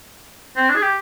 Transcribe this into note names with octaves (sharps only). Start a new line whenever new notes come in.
C4
D4
G#4
G4